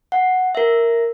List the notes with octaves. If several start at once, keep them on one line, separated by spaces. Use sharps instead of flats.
F#5
A#4 E5